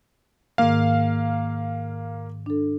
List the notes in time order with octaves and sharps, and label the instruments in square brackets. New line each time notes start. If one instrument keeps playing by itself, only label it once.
[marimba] G#2 D#3 [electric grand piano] A#3 F5
[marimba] D4 A4